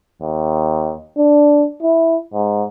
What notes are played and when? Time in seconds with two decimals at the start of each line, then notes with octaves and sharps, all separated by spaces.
0.22 D#2
1.18 D4
1.83 E4
2.34 G#2